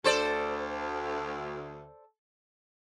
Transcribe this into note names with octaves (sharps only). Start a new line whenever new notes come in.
D2 A4 C5 D5